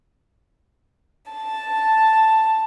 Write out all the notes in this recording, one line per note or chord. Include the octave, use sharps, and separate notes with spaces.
A5